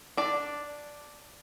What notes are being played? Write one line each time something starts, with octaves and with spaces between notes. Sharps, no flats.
D4 D5